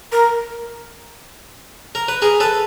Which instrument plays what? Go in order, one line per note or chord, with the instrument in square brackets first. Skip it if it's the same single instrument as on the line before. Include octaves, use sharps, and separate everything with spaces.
[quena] A#4
[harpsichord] A#4
B4
G#4 A#4
A4 B4